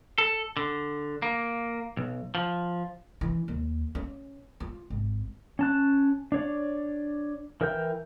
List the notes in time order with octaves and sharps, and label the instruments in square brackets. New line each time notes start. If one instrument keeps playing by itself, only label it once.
[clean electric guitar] A4
D3
A#3
B1
F3
[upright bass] E3
D#2
C#4
F4
G#1
[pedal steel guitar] C#4 A5 F#6
D4 C#5 D5
E3 A#4 E5 G5 G6